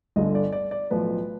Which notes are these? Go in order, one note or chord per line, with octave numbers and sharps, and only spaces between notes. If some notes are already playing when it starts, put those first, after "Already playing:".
G1 G2 D3 D#5
D5
D5
D5
B1 A2 F3 B4